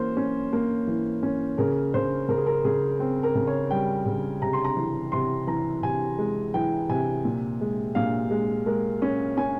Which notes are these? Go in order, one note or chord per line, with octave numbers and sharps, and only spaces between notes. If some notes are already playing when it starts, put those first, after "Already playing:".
Already playing: E3 A#3 C#4 C5
C#4
A#3
E3
C#4
C#3 A#4
C#3 C5
C#3 A#4
G#4
A#4
C#3 G#4
C4
A#4
C#3
C#5
G3 G5
C#3
C3 A#5
C6
A#5
E3
C3 C6
E3 A#5
C3 G#5
G#3
E3 G5
C3 G#5
A#2
G#3
A#2 F5
G#3
G#3 A#4
C#4
C#4 G#5